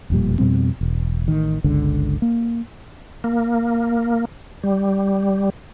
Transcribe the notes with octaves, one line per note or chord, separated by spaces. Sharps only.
E1 F2 A#2 G3
F2 B2 G3 C4
E1
A1 D#3
G1 C#2 D3
A#3
A#3
G3